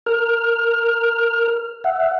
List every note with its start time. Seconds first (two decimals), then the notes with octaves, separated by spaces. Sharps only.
0.06 A#4 F6
1.84 E5 F#5